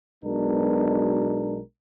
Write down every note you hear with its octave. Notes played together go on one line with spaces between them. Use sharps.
B1 B2 G#3 B3 D4 A#4